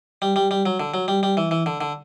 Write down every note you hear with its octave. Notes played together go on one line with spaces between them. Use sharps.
G3
G3
G3
F#3
D3
F#3
G3
G3
E3
E3
D3
D3